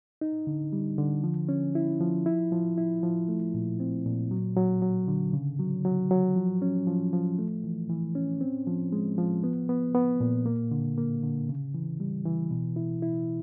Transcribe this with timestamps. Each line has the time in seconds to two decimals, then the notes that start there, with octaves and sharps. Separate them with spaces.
0.21 D#4
0.47 D3
0.73 G3
0.98 D3
1.24 F3
1.49 C#4
1.75 E4
2.00 F3
2.26 E4
2.52 F3
2.78 E4
3.03 F3
3.29 A3
3.54 A#2
3.80 C4
4.06 A#2
4.31 F#3
4.57 F#3
4.82 F#3
5.08 D3
5.33 C#3
5.59 F#3
5.85 F#3
6.11 F#3
6.36 F3
6.62 C#4
6.87 F3
7.13 F3
7.39 A3
7.64 E3
7.90 E3
8.15 C#4
8.41 C4
8.67 F3
8.92 G#3
9.18 F3
9.44 B3
9.69 B3
9.94 B3
10.21 A#2
10.46 A#3
10.71 D3
10.98 A#3
11.23 D3
11.49 C#3
11.74 E3
12.00 G3
12.25 E3
12.51 B2
12.76 E4
13.02 E4